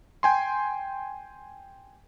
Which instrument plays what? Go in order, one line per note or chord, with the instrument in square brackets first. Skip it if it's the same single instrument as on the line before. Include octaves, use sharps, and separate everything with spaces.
[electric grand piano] G5 G#5 C6